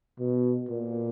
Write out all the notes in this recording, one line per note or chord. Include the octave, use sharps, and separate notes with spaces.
B2
A#2